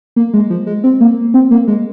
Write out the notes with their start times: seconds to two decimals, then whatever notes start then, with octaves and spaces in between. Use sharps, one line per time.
0.16 A#3
0.33 G#3
0.50 F3
0.67 G#3
0.84 C4
1.01 A#3
1.34 C4
1.51 A#3
1.67 G#3